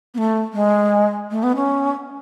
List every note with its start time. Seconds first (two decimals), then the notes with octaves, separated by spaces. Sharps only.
0.14 B3
0.18 A3
0.53 G#3
1.31 A3
1.43 B3
1.56 C#4